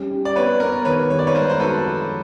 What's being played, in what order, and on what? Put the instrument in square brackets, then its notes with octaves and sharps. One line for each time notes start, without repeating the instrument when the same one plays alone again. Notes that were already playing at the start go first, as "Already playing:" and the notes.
Already playing: [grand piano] G3 C#4
G4
[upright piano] D5
[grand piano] B3 [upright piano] B4 C#5
[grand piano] B3 [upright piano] A#4
[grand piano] D#3 [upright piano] B4 C#5
[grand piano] G3 [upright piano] C#5
[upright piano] D5
B4 C#5
[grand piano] G#3 [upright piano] A#4 C5
[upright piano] C5
[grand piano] F#4 [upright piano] A4 B4
[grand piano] F3